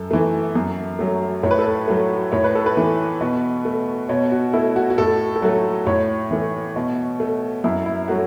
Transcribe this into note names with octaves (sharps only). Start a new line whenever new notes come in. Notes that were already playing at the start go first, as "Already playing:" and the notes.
Already playing: F#2 A4
E3 A3
F#2
F#3 A3
A2 C#5
B4
A4
B4
F#3 A3
A2 C#5
B4
A4
B4
E3 A3
B2
A3
B2 C#5
F#4
A3 E4
F#4
F#4
A2 A4
A4
F#3 A3 F#4
A2 C#5
E3 A3
B2
A3
F#2 E4
E4
F#3 A3 F#4